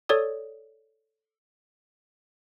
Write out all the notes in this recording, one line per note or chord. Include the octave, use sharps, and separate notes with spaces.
A4 C#5 D5 D#6